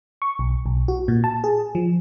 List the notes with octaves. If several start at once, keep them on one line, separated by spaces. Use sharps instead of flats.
C#6
B1
B1
F#4
A#2
A5
G#4
F3